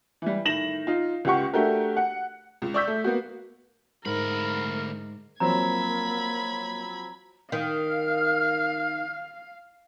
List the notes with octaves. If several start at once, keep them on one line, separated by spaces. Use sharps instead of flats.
E3 G3
A2 D#3 A#6 E7 F#7
D#4 F4
C#2 F4 G4 F#5 C#6
A3 D4 F#4 G4 A#4
F#5
C#2
D5 C#6 E6 G6 B6
A3
A#3 B3 F#4
D2 G#2 A#4 B5
F3 F#3 A#3 C4 A#5 B5 G#6
D#3 F5 F6